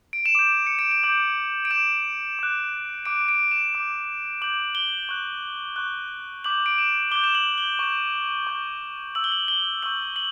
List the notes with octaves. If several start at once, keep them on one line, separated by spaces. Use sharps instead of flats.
D7
E7
D6 G6 D7
C#7
D7
E7
D6 G6 F#7
D7
D6 G6 E7
D6 F#6
D6 F#6 D7
D7
E7
D6 G6
D6 G6 F#7
G7
C#6 F#6
C#6 F#6
D6 G6 F#7
D7
E7
D6 G6 G7
E7
F#7
G7
C#6 G6
C#6 G6
C#6 E6 G6 F#7
G7
F#7
G7
C#6 E6 G6 F#7
F#7